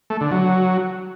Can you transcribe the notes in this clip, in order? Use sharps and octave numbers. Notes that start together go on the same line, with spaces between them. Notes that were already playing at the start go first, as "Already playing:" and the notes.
A3
D3
F#3